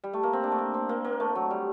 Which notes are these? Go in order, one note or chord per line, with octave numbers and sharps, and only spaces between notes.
G3
A3
A#3
C4
D4
A3
A#3
C4
A#3
A#3
A3
F#3
G3